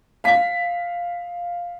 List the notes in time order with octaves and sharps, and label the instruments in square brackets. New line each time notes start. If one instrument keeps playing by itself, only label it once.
[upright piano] F5 B6